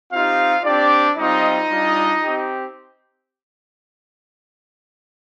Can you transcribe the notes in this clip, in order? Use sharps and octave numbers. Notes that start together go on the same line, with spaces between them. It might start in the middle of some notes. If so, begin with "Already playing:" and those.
C4 D#4 F4 G4 F5
C4 D4 G4 D5
G3 C4 D#4 F4 D#5
G3 D4 F4
C4 G4